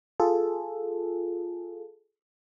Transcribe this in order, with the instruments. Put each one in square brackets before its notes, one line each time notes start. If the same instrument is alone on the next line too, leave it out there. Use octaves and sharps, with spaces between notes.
[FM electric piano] F4 G#4 A4